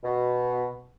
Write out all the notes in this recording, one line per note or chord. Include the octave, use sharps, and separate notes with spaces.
B2